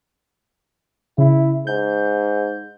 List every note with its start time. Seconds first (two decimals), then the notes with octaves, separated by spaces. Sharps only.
1.18 C#3 E4
1.67 G#2 G6